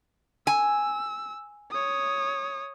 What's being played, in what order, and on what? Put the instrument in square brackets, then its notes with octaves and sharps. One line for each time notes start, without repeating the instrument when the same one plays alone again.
[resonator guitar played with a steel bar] G#5 [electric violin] E6
[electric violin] C#5 D#6